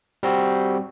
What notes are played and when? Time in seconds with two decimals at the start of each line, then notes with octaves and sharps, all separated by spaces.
0.23 G3 C4 F#4